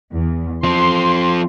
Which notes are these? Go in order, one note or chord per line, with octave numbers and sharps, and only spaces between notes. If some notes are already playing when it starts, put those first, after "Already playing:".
E2
F3 C4 C6